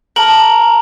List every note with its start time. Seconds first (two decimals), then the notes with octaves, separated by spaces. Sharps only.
0.16 A#4 A5 F#7